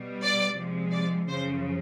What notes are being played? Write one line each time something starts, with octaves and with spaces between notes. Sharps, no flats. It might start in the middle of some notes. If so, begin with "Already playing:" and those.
Already playing: B2 G3
D5
C3 F3 G#3
D5
F#2 C#3 F3 C5